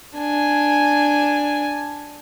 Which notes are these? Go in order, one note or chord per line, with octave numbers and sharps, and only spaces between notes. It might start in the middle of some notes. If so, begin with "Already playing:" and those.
D4 G#5